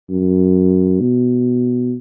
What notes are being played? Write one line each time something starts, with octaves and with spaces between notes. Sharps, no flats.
F#2
B2